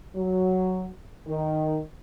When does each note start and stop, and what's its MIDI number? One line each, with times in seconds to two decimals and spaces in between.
0.16 0.89 54
1.27 1.78 51